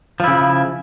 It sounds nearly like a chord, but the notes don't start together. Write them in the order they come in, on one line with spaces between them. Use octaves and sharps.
F3 E4 C#3